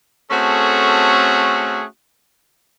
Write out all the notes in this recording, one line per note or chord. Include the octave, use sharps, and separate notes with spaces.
A3 C4 C#4 F#4 G#4 A4